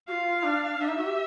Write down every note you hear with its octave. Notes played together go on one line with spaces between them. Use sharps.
F4 F#4 F5
D4
D4 E5
D#4
F#4
G4